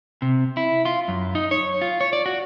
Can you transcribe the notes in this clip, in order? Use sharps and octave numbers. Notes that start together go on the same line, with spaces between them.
C3
E4
F4
F#2
D#4
C#5
F4
C#5
D5
F#4